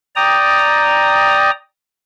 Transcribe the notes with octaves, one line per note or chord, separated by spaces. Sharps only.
D5 G5 A#5 D#6